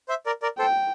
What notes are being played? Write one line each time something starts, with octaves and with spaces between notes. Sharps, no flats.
C5 E5
A#4 D5
A#4 D5
A4 C5 G5